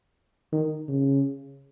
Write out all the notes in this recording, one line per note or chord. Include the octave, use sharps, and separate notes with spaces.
D#3
C#3